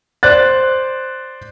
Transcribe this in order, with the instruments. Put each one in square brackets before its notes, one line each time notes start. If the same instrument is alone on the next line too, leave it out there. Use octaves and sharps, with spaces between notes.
[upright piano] C5 D5 F#6 A6